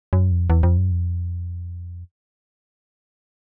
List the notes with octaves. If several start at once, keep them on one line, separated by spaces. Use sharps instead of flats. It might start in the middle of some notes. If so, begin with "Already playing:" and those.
F#2
F2
E2
F2
F#2
F2